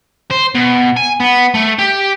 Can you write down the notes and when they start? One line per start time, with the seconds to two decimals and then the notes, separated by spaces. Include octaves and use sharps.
0.31 C5
0.55 B2
0.96 G#5
1.20 B3
1.54 A3
1.78 G4